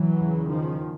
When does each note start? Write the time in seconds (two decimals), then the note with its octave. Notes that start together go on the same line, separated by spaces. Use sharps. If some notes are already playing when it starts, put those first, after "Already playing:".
Already playing: E3 F#3
0.19 E2 C#3
0.49 D#3 F3